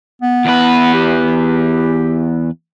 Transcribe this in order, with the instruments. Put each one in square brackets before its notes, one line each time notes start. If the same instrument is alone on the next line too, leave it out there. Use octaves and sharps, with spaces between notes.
[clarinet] B3
[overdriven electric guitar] E2 B4
[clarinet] G4